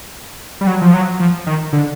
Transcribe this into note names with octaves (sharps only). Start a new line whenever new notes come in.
G3
F#3
F3
F#3
F3
D#3
D3